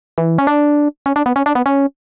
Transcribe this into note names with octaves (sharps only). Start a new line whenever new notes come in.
E3
C#4
D4
C#4
D4
B3
C#4
D4
B3
C#4